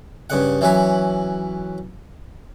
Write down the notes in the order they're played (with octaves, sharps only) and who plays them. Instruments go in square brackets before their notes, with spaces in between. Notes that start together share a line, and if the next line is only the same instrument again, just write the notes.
[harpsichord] G2 C#3 F#5
E3 F#3 C#4 B4